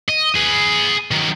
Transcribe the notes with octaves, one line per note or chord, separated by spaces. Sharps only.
D#5
G#4 B4
D#3 F#3